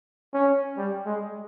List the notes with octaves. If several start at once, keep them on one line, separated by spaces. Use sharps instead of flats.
C#4
G3
G#3